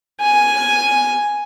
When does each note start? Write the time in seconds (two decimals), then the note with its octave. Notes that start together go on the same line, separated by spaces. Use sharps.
0.21 G#5